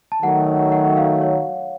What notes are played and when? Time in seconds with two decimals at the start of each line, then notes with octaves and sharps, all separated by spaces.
0.12 A5
0.22 D#3 F#3 A3 F#5
0.72 F#5
0.97 F5
1.22 C#5